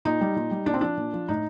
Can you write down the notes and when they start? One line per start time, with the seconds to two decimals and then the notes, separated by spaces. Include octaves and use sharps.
0.05 A#2 D#4
0.21 G3
0.36 A#2
0.51 G3
0.66 A#2 D4
0.74 C4
0.81 F3 D4
0.97 A#2
1.13 F3
1.28 A2 D#4